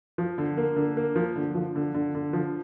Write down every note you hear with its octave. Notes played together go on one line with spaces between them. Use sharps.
F3
D3
A#3
D3
A#3
F3
D3
F3
D3
D3
D3
F3